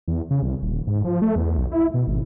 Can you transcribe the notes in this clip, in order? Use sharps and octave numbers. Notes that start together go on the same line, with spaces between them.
E2
C#3
C2
D#1
G#2
F3
A3
E2
B1
E4
B2
G#1